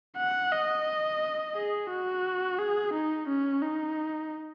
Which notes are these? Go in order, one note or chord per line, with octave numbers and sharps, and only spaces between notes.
F#5
D#5
G#4
F#4
G#4
D#4
C#4
D#4